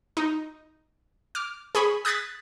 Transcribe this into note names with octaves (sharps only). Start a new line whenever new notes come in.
D#4
D6 F6
G#4 B5 C#6 D#6
D#6 F#6 G#6 A6 B6